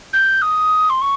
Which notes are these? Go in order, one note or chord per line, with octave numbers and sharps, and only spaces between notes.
G6
D#6
C6
C#6